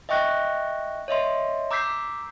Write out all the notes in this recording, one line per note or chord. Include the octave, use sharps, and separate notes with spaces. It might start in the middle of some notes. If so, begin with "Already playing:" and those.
D#5 E5 G5 C#6 F#6 A#6
C#5 D#5 E5 C6
A#5 D6 E6 G6 B6 C7